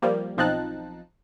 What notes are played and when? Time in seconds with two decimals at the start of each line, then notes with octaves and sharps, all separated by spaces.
0.02 F3 G3 A#3
0.37 B1 F3 C4 D#4 A5 F#6